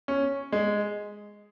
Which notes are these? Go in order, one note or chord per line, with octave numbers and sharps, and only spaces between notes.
C#4
G#3